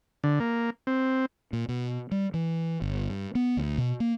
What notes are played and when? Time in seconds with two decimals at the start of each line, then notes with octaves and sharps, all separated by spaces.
0.24 D3
0.40 A#3
0.87 C4
1.53 A#2
1.69 B2
2.11 G3
2.34 E3
2.82 G1
3.10 G2
3.35 B3
3.57 D2
3.78 B2
4.00 A#3